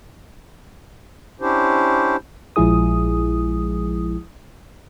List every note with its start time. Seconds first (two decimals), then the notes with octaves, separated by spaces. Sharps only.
1.41 C#4 D4 E4 G4 C5
2.56 A#1 F3 G#3 E4 G#4 D#6